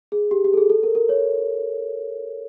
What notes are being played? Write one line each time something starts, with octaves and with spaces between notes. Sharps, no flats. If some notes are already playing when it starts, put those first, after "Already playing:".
G#4
G4
G4
A4
G#4
A4
A#4
A#4
C#5